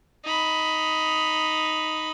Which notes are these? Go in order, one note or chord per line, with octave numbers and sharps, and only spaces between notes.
D#4 B5